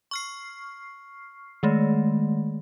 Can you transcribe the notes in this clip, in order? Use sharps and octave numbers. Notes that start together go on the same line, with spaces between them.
C#6 F6 C7
D#3 G#3 A3